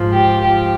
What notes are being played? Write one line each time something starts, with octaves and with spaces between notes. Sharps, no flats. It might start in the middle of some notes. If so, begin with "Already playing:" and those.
Already playing: G#2 F3
G4
G#2 F3 G4